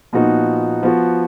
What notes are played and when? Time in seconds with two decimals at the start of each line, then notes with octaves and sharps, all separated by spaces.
0.13 A#2 F3 B3 D#4 F#4
0.83 F3 B3 F#4